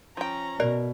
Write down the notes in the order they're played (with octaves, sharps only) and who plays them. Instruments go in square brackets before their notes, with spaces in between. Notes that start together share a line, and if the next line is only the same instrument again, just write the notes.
[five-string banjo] F3 G5 [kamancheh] C#4 A#5
[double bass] B2 [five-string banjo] A#4 [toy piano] D5